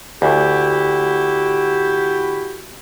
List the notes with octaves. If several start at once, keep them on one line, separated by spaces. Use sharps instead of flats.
D2 E4 F#4 G4